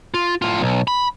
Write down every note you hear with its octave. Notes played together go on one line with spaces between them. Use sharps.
F4
A2 F4
B1
B5